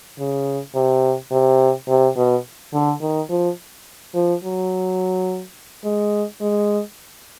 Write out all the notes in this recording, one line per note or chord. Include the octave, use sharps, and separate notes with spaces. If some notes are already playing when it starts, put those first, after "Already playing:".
C#3
C3
C3
C3
B2
D3
D#3
F3
F3
F#3
G#3
G#3